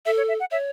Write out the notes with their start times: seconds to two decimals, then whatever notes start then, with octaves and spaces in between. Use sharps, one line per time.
0.06 A4 E5
0.17 C#5
0.28 E5
0.40 F#5
0.51 C#5 E5